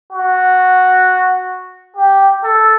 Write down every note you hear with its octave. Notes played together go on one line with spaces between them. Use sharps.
F#4
G4
A4